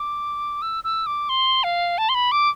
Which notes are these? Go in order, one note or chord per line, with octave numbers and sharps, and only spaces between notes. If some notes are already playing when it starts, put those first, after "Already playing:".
Already playing: D6
E6
E6
D6
C6
F5
A5
C6
B5
D6